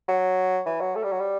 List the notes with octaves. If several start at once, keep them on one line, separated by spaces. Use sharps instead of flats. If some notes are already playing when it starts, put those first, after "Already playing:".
F#3
E3
F#3
A3
G3
F#3
G3